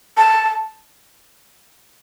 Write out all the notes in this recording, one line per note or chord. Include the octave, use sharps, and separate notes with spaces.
A5